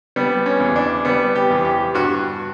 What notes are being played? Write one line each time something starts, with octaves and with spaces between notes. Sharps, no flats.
G3 B3
C#4
E2
D4
G3 B3
G4
E2
G4
G2 F#4